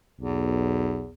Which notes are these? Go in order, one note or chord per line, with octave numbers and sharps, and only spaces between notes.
B1 E2